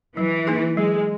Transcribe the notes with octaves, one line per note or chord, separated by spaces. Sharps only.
E3 F#3
A#3 D#4 G#4
F#3 G#3